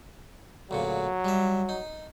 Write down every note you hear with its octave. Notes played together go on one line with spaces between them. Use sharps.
D2 A#2 C#3 F#3
G3 E5
D#4